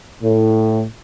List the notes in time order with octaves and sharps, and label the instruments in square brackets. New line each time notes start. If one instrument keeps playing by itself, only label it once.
[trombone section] A2